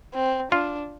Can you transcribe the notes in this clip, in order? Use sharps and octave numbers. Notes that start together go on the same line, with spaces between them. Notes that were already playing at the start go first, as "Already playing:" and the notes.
C4
D4 F4